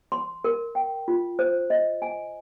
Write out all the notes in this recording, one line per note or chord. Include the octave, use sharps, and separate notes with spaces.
C6
A#4
G5
F4
C5
D#5
G#5